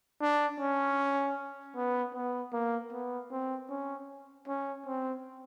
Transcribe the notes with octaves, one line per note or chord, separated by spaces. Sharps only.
D4
C#4
B3
B3
A#3
B3
C4
C#4
C#4
C4